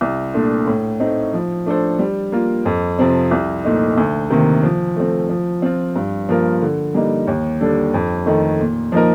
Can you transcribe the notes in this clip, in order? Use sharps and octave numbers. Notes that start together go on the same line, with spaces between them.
C2
A#2 A3 D4
A2
A3 C4 D#4
F3
A3 D4 A4 C5
G3
A#3 F4
F2
C3 F3 C4
C2
A#2 A3 D#4
D2
C3 D#3 A#3
F3
A3 C4
F3
C4 F4
G2
F3 A#3 F4 A#4
D3
G3 A#3 D#4
D#2
D3 G3 D4 A4
F2
D#3 A3 D#4
A#2
F3 A#3 D#4 A#4